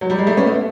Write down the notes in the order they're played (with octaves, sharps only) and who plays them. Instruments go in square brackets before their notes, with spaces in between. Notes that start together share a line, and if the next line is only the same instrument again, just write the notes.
[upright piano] F#3
G3
G#3
G3 A3
B3 C#4
A3 B3